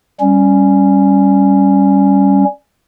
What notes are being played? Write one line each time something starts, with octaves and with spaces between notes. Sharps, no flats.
G3 C#4